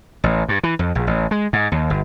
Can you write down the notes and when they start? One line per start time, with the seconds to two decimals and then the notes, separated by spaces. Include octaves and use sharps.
0.24 A1
0.49 G2
0.63 E3
0.79 F2
0.95 A#1
1.07 A1
1.31 G#3
1.53 G#2
1.72 D#2
1.90 G1